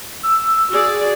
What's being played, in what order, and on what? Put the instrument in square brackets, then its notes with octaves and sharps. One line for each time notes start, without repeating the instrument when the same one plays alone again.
[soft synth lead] E6
[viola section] F#4 G#4 D5